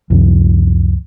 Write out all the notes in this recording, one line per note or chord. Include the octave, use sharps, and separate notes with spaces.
C#2 F#2 C3 F3